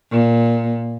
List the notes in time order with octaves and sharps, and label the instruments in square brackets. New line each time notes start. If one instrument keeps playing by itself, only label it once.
[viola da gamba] A#2